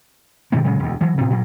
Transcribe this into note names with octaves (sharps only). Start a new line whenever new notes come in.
B2 D#3 A3 A#3
A#2 C#3 F#3 G#3
E1 D2
E3 F#3
A2 C3
G2 A#2 F#3